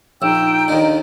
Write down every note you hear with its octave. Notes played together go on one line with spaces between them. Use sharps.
A#1 D#4 G5 E6
D#2 D3 D#5